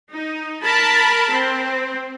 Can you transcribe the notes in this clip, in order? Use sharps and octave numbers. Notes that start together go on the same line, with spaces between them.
D#4
A#4 A5 B5
C4